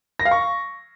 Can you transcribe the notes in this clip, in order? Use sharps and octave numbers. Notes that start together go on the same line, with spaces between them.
A#6
F5
C#6